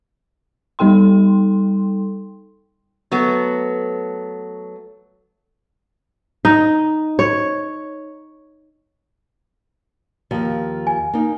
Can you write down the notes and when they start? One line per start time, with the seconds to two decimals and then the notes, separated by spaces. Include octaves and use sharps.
0.79 G3 D#4 A4 G5 C6
3.12 F#3 A3 B3
6.45 D#4
7.19 C#5
10.31 D#2 F3
10.87 G#5
11.14 A#3 D#4